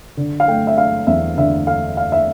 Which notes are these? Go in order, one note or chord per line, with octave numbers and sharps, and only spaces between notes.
D3
F5
A3 G5
E5
D4 F5
E2 E5
D3 E5
A3 F5
D4 F5
E5